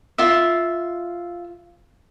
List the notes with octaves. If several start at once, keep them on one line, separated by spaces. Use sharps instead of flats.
F4 E5